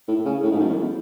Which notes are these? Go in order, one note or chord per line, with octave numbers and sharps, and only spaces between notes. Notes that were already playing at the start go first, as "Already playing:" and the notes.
A2
C#3
A2
G#2
F#2
E2